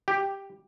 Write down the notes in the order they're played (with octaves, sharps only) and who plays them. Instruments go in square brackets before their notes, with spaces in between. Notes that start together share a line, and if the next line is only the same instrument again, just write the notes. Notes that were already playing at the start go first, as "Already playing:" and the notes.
[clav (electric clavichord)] G4